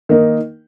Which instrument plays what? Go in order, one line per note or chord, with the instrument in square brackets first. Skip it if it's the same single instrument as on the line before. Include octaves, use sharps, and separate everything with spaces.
[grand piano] D#3 A#3 D#4